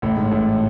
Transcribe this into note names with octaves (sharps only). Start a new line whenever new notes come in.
A1 A2
G#2
A1 A2